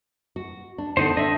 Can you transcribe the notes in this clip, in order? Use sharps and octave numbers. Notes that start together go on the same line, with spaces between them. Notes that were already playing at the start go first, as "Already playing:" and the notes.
F#4
D4
D3 A3 B3 D4 D#4 C5
D4 D#5 E5